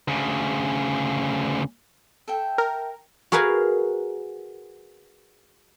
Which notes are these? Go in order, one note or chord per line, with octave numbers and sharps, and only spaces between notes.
D2 C#3
A4 E5 G5
A#4
F#4 G#4 A#4 B4 F5 G#5